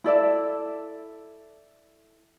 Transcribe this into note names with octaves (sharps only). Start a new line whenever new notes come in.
E4 A4 D5 E5